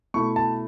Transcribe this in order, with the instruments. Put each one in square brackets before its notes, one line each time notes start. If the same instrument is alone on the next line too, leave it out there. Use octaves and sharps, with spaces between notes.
[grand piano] B2 A3 E4 C#6
A5